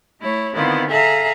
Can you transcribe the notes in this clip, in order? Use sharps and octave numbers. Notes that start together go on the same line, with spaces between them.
A3 E4 C#5
D3 D#3 B3 C4 E4 F4
G#4 A4 E5 F5 A#5